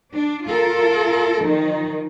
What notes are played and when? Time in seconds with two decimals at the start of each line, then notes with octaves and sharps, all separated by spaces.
0.13 D4
0.47 F4 A4 A#4
1.42 D#3 F3 D#4